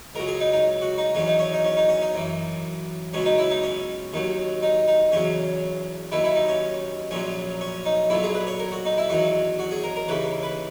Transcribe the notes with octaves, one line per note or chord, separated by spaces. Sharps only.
C#2 C#3 F#3 A#4
G#4
D#4
D#4
F#4
D#4
E2 D#3 F#3 C#4
D#4
C#4
D#4
C#4
D#4
C#4
D#4
F#2 E3
C#2 B2 F#3 C#4
D#4
E4
D#4
C#4
D#2 D#3 F#3
D#4
D#4
E2 C#3 F#3 C#4
D#2 D#3 F#3 E4
E4
D#4
C#4
A#1 A#2 F#3 C#4
C#4
D#4
B1 A#2 F#3 E4
G#4
B4
C#5
A#4
F#4
D#4
E4
E2 D#3 F#3 F#4
F#4
G#4
A#4
A#4
D#2 C#3 E3 B4
B4